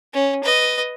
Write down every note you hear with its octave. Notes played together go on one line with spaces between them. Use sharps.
C#4
B4 D#5